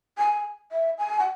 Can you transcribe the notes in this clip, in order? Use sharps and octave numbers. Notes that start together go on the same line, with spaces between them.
G#5
E5
G#5
F#5